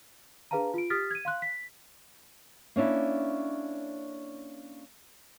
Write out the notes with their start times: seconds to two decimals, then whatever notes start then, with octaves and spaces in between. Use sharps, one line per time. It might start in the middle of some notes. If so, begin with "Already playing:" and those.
0.51 D4 G#4 B4 F5 A5 A#5
0.74 F4 D7
0.90 G4 D#6 F6 A6 B6
1.11 G#6 D#7
1.25 F5 C6 F#6
1.42 B6
2.76 A#3 C#4 D4 E4